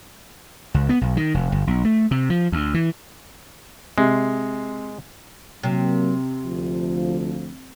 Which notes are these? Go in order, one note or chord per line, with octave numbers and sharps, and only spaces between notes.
C#2
B3
B1
D#3
F1
G1
B1
A3
C3
F3
D2
E3
C3 G#3
C3 F#3 A#3
D2 F3